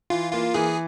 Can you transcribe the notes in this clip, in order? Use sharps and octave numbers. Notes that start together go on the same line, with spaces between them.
E3 F4
A#3 F4
E3 G#4